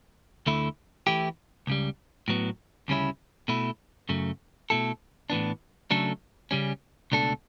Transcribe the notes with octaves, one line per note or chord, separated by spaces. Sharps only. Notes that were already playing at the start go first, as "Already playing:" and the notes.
D2 D3 A3 E4
E3 A3 E4 G4
C#2 C#3 G3
A2 F#3 B3
D2 C#3 G3 C#4 E4
B2 A3 E4
F#2 C#3 F#3 A3
B2 A3 E4 A4
A2 E3 B3 D4
C#3 F#3 A3 D4 A4
C#3 G3 C#4
C#2 B2 A3 D4 A4